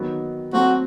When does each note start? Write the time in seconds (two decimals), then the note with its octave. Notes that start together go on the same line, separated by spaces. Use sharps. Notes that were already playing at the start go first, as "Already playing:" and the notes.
Already playing: D#3 F#3 B3
0.53 F#3 A3 C4 F#4